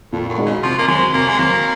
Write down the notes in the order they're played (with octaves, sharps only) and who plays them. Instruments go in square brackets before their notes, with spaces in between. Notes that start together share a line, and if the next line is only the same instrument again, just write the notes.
[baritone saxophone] F2 [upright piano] A#2
[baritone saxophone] F#2
[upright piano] G#3 D#4 F#4
[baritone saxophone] C#3
[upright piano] C3 [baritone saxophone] F3
[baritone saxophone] A#3
[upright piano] F#3 C4 [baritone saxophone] G#3
[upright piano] C3 [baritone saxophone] A#3
[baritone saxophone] G#3
[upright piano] F#3 C4 [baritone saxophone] A#3